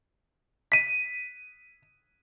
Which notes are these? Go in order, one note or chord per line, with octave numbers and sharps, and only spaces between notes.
B6 D#7